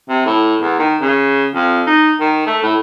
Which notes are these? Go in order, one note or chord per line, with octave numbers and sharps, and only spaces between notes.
C3
A2
E2
D#3
C#3
F2
D#4
D#3
A3
A2